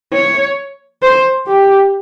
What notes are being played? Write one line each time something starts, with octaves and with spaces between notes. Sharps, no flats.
C#5
C5
G4